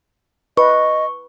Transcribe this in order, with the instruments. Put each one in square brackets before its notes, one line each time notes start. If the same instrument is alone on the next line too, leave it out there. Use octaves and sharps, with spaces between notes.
[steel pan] B4 [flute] D#5 [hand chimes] C#6